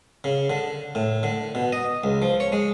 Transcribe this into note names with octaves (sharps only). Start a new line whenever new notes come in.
C#3
D3
A2
D3
B2
D#5
C#2
F3
C#5
G#3